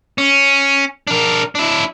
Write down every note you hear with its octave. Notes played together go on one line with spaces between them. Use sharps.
C#4
D4 A#4
D4 E4